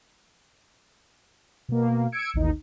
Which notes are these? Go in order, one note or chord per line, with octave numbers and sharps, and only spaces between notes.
B2 A#3
E6 G#6 C#7 D7
A1 D#2 D#4